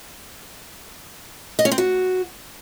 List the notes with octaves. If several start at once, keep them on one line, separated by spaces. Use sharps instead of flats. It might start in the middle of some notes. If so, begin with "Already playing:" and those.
D#5
C#4
C4
F#4